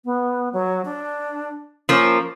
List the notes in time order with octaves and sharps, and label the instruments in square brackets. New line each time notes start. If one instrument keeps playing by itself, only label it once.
[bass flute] B3
F#3
D4
[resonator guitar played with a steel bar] F3 A#3 [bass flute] C#4